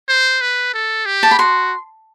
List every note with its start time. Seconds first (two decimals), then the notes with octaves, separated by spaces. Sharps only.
0.09 C5
0.41 B4
0.74 A4
1.06 G4
1.23 A5
1.31 B5
1.39 F#4 C6